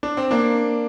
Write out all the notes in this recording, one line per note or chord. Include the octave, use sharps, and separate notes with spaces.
D4
C4
A#3 D4